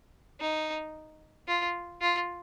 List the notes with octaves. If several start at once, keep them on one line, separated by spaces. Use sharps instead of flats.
D#4
F4
F4